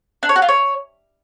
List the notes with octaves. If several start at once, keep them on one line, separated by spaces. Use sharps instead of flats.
D4
C#5
F#4
F4
C#5